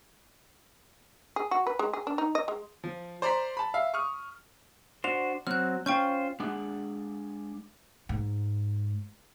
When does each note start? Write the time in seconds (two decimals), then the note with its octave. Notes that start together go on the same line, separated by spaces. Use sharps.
1.36 G#4
1.51 F#4
1.67 B4
1.79 G#3
1.93 G#4
2.07 D4
2.18 D#4
2.35 D#5
2.48 G#3
2.84 F3
3.22 C5 D5 A#5 C6 B6
3.57 A5 B5
3.74 E5 F5
3.94 C#6 D#6 F6
5.04 D4 F#4 C5 F7
5.47 F#3 C4 F6 F#6
5.86 C#4 F4 C5 G5 C#6 G6
6.40 G#3 D4 F#5
8.09 G#2